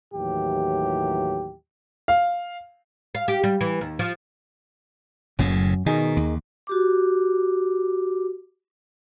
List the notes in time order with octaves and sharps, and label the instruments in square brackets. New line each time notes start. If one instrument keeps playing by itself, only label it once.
[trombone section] D#2 A2 E3 F#3 G4
[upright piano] F5
[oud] F5
G4
G3
E3
D#2
F3
[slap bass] F#1 A2 C#3 [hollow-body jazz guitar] F#2
[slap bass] B2 [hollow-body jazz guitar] D#3 D#4 G#4
[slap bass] D#2
[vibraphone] F#4 G4 D6